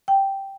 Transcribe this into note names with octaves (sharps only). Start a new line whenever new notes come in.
G5